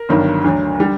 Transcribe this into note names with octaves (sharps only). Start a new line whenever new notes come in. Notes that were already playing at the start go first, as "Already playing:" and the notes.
Already playing: A#4
G1 G2 D#3 F#3
D2 D3 F#3
D3 G3